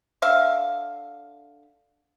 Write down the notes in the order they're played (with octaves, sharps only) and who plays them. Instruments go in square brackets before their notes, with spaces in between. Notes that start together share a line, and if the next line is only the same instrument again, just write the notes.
[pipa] D3 E5 F5